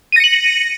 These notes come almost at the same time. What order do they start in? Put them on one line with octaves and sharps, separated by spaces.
D#7 A#6 C#7 F#7